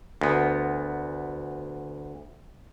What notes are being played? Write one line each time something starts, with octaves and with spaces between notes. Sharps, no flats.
D2 B3